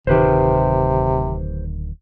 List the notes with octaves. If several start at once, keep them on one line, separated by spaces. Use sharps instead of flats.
D1 C3 D#3 G4 B4 C5